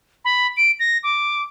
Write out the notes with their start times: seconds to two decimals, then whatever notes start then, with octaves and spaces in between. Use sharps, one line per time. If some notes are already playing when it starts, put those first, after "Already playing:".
0.25 B5
0.57 D7
0.80 A#6
1.03 D6